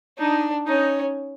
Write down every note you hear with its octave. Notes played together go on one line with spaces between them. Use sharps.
D4 D#4
C#4 D#4